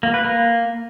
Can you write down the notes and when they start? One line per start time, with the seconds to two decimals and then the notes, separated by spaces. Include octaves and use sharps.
0.03 A#3
0.14 B4
0.25 A#3